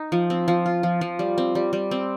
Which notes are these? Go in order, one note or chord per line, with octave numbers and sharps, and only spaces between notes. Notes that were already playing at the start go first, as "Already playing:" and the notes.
Already playing: D#4
F3
C4
F3
F4
F3
F3
G3
C4
G3
G3
C4